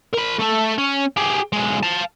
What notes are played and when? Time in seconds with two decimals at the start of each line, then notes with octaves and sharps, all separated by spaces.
0.13 A#4 B5
0.39 A3 A4
0.78 C#4
1.17 G4 G#4
1.53 B1 G#3
1.83 F5 A5